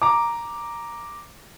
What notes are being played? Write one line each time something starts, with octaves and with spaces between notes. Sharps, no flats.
A#5 D6